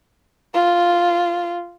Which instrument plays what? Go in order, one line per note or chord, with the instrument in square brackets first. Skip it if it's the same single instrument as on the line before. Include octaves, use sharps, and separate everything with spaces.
[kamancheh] F4